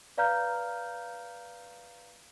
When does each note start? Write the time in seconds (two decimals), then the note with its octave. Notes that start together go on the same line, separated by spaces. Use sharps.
0.17 B4 D5 F5 A#5 F6 G6